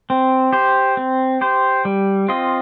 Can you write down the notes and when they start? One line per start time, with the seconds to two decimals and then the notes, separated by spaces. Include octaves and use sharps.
0.10 C4
0.53 G4 C5
0.97 C4
1.41 G4 C5
1.85 G3
2.28 C4 F4 D#5